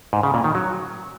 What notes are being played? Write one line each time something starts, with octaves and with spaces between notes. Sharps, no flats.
G#2
C#3
A#2
D#3
F#3